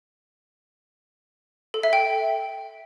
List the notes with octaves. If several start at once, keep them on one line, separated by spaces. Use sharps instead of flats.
A4
E5
G5